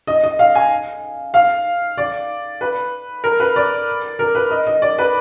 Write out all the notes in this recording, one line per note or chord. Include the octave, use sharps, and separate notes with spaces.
D#5
D#5
F5
G#5
F5
D5
B4
A#4
B4
D5
A#4
B4
D#5
D#5
D5
B4